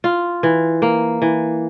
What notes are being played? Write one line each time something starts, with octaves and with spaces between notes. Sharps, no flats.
F4
E3
A#3
E3